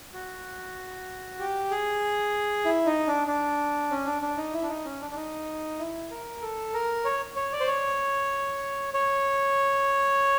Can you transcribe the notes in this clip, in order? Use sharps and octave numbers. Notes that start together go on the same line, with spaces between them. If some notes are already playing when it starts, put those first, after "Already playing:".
F#4
G4
G#4
E4
D#4
D4
D4
C#4
D4
D4
D#4
E4
D4
D#4
C#4
D4
D4
D#4
E4
A#4
A4
A#4
C#5
C#5
D5
C5
C#5
C#5